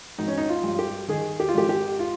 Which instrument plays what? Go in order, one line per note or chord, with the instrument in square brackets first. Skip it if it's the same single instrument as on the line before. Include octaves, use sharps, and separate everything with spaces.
[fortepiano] G#1 D#4
C#4
D#4
F4
G2
G4
D#3 G#4
G4
F4
G#1 G4
G4
F4